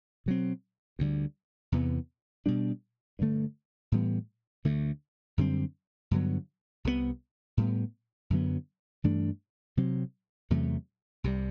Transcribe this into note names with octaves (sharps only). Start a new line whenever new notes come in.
B2 F#3 C4
D2 D3 G3
E2 C3 E3 B3
B2 G3 D4
G2 D3 A3
A2 E3 G3 B3
D2 D3 A3
F#2 D3 G3 C4
G2 D3 F#3 B3
C2 C3 F#3 B3
A2 G3 B3
F#2 D3 F#3 B3
G2 E3 A3 D4
C3 F#3 C4
E2 C3 F#3 A3
C2 C3 G3